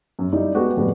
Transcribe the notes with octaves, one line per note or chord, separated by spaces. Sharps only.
F#2
G3 D#4 E4 D5
G#3 A3 B3 F#4 G4
F2 A2 G3 G#3 B3